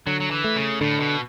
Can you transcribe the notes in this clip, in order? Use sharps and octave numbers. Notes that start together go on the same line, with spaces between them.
D3 F#3
F#3
E3
A3
C#3
A2 D3
B2